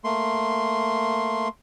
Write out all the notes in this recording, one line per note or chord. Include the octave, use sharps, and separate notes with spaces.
A3 A#3 C6